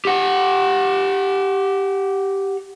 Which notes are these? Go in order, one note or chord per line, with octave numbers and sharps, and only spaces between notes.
G4 F#5